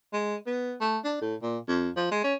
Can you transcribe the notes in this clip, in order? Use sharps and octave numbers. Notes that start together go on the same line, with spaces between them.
G#3
B3
A3
D4
A2
A#2
F2
F3
G#3
C#4